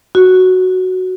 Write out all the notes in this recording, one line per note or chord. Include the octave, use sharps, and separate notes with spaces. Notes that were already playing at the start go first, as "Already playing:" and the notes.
F#4